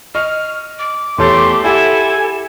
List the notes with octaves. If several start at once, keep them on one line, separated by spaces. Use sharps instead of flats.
D#5 C#6 F6
D6
E2 A3 G4 C#5 C6 A6
E4 G4 A4 E5 F#5 G#5